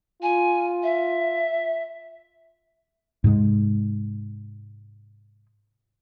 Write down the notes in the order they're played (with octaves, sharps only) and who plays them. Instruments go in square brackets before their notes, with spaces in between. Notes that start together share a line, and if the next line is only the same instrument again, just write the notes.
[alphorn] F4 [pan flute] G#5
[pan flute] E5
[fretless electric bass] G#2 C3 G#3